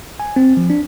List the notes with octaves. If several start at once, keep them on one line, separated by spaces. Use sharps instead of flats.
G#5
C4
F3
D4